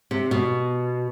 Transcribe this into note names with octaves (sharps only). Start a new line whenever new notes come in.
C3
B2